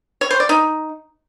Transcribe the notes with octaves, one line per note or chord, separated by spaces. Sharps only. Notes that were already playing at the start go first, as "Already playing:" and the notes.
C#5
C5
D5
D#4